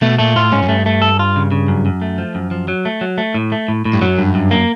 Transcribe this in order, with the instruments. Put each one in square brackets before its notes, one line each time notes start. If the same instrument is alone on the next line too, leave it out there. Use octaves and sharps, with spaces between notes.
[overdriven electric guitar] B2 [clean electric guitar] A3
[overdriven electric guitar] A#2 [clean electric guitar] A3
[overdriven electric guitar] A2 [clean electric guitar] F4
[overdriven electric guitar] G#2 [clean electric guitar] C#4
[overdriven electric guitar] F#2
[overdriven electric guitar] G2 [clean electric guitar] A3
[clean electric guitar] A3
A4
F4
C#3
C#3
F#2
F#2
A3
F3
F#2
F3
F#3
A3
F#3
A3
A2
A3
A2
A2
[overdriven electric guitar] G2
[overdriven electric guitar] F#2 [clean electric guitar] F#3
[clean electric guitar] G2
G2
A#3